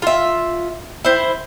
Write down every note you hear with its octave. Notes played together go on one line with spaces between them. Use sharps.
F4 E5
E4 C5